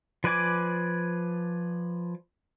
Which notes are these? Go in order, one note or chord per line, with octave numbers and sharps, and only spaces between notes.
F3 B4 D5 G#5 D6